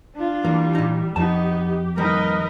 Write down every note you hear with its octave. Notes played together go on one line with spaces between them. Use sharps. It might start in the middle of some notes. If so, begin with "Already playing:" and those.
D4 F4
E3 G3 A#3
A#2 D#4
F2 B3 D#4 G4 A5
D#3 G3 A#3 D#4 A#4 B4 D#5